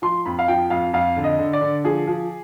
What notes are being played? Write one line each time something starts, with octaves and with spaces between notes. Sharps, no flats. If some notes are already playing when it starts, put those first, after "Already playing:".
F3 C6
F2 B5
F5
F3 G5
F2 F5
F2 F5
D3
D#5
D3
D5
D3
F3 G#4
F3